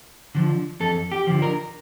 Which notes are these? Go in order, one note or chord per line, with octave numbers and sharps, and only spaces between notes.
D3 F3
F2 A4
G4
D3 F3
A#4